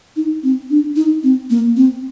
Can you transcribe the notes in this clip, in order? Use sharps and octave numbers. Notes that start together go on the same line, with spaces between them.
D#4
C4
D4
D#4
C4
A#3
C4